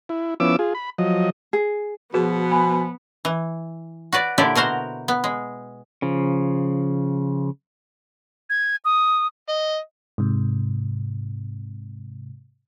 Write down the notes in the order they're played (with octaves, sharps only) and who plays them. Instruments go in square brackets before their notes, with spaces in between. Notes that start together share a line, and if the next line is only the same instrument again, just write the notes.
[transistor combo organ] E4
F3 B3 C#4 E4 D6 E6
F4 G#4
B5
F3 F#3 D#5
[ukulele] G#4
[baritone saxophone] B2 [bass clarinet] F3 [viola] B3 [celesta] F#4 G#4 B4
[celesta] G#5 B5
[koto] E3
F#4 B4 D5
A#2 D3 E4 G4 D5
B2 F#4 A#4 C5
B3
G#3
[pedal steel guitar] C#3 F3
[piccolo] G#6
D#6
[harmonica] D#5
[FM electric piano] G#2 C3